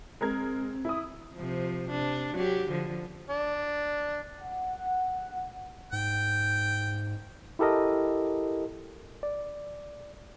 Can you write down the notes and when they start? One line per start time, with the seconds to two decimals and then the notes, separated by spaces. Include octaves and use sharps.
0.21 G#3 C4 A#4 G#6
0.85 E4 D#6
1.34 C3 F3
1.89 C3 D4
2.35 F#3 G4
2.70 D3 F3
3.30 D4
4.41 F#5
5.93 G#2 G5
7.59 E4 G4 A4 A#4 D#5
9.23 D5